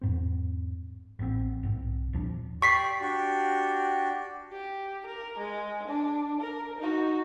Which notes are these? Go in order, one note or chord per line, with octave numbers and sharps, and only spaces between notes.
E2 G#2 C4
A1 A2 B3 C4
B1 G#2 C4
D#1 F3 D4
G4 D5 C#6 B6 C7
D4 F#4 G4
G4
A#4
G#3
D4
A#4
D#4 F#4